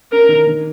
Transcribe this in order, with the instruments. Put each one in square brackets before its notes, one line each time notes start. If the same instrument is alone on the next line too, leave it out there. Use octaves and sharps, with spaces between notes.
[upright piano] C#4 [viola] A#4
[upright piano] D#3
D#3